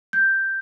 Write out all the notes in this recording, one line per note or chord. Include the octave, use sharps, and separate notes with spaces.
G6